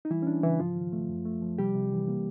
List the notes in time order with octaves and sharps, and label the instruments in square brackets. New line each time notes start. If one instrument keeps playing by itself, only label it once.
[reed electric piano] D#4
E3 G3 E4
C#4
E3 D4
C#3 E3 E4
G#2 F3 F4
D#3
A3
F#2
A3
F3
C3 G3 G4
C3
E3
A#3